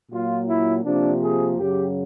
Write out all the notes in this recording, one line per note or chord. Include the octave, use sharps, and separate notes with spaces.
A#2 F#3 A#3 F4
E4
C3 F3 A#3 D4
G#4
F#2 C#3 F#3 G4